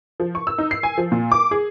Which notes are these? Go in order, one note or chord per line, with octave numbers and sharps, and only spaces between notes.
F3
C#6
E6
D#4
C7
G#5
F3
A#2
D6
G#4